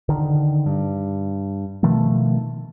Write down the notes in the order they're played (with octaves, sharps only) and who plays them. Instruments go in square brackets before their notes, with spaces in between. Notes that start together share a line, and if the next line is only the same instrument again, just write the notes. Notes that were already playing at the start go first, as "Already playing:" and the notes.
[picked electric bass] D3 D#3
G2
B2 D#3 F3 A3